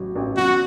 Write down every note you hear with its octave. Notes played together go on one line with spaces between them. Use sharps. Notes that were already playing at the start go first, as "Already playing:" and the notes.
Already playing: A1 F#3
A1
F#3 F#4